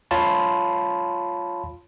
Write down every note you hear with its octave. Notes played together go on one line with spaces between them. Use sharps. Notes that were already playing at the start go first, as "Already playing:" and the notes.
F4 C#5 F5 A5 B5 C6